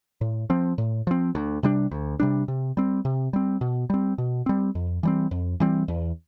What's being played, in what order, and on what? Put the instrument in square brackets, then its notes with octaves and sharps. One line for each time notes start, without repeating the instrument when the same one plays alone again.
[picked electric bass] A2
F3 C4
A2
F3 C4
D2
C3 G3 D4
D2
C3 G3 D4
C3
G3 C4
C3
G3 C4
B2
G3 C4
B2
G3 C4
F2
E3 G3 C4
F2
E3 G3 C4
E2